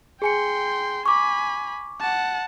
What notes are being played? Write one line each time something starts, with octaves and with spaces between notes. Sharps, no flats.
G#4 G5 G#5 C6 C#7
G#5 B5 C#6 D6
F#5 A5